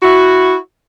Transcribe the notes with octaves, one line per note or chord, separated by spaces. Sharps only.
E4 F#4